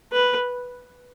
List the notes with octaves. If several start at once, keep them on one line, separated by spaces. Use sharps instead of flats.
B4